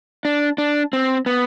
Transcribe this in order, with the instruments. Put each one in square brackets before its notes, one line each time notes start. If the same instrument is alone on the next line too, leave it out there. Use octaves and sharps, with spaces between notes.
[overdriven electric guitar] D4
D4
C4
B3